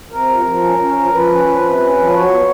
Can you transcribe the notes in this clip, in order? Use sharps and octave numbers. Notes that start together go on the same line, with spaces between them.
C3 A#4
F3
F3
C#4
C#4
F3
F3 B4
C#4
F3
C3
C#4
F3
F#3 C#5
B3